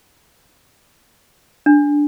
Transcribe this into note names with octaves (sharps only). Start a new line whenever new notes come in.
D4